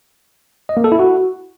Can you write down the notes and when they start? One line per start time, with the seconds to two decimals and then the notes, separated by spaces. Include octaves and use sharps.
0.69 D#5
0.77 A#3
0.84 A4
0.92 E4
0.99 F#4